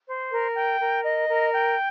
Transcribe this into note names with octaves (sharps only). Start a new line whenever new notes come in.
C5
A#4
G5
A#4
D#5
A#4
G5